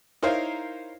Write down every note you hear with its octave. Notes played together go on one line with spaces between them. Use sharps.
D#4 E4 A#4 C5 C#5 F5